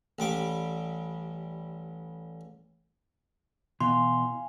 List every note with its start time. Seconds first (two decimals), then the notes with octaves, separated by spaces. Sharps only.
0.19 A1 G3 D6
3.80 B2 E3 F5 G#5 C6